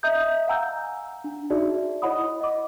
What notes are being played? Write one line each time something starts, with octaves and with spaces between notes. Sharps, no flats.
D#5 E5 A#5 D#6 G6
F5 F#5 G#5 A#5 E6 G6
D4
D#4 F#4 G#4 D5 E5
E4 C#5 D#5 F#5 B5 D#6
D#5 D6